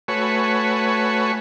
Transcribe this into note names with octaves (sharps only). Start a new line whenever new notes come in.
A3 F#4 B4 C#5 G#5